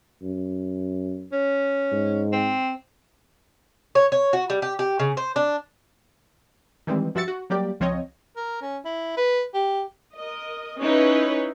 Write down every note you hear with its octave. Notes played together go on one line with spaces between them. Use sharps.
F#2
C#4
G#2
C4
C#5
C#5
F#4
G3
G4
G4
C#3
C5
D4
D#3 E3 G3 G#3 C4
G2 F3 F#4 E5 A6 C#7
F#4
F#3 G3 A#3 G4 D5
C#2 F3 C4 C#5 D#5
A#4
C#4
E4
B4
G4
A#4 D#5
C#4 D#4 E4 B4 C#5